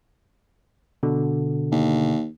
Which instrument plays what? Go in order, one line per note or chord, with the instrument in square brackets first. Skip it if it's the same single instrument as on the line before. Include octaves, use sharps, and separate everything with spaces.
[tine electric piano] B2 D3
[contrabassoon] D#2